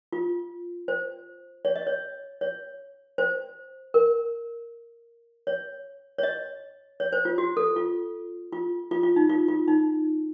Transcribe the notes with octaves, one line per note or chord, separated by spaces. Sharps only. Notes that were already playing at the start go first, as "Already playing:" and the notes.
F4
C5
C#5
D#5
C#5
C#5
C5
A#4
C#5
C#5
D#5
C#5
C5
F4
F#4
A4
F4
F4
F4
F4
D#4
F4
F4
D#4